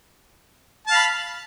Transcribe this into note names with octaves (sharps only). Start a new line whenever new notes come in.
F5 A5 B5